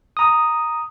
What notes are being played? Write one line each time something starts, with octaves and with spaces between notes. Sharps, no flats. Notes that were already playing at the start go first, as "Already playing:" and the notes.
A#5 D#6